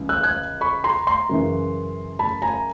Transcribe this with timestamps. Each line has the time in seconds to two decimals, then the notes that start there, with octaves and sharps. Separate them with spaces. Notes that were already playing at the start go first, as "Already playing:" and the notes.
Already playing: C#2 C#3 E3
0.09 E6 F#6
0.23 F#6 G#6
0.61 B5 C#6
0.84 A#5 C6
1.07 A#5 C6
1.29 F#2 C#3 E3
2.19 A5 B5
2.42 G#5 A#5